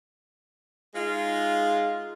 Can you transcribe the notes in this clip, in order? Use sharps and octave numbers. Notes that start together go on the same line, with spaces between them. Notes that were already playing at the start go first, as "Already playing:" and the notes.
G#3 D#4 F4